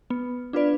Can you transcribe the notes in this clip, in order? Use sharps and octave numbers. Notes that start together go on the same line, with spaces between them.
B3
D4 F4 B4 D5